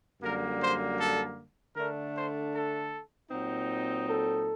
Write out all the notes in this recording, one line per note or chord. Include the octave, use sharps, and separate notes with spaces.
F#2 D3 G3 A#3 A#4
C5
A4
D3 A3 D4 A#4
C5
A4
A#2 F#3 C4 D#4
A4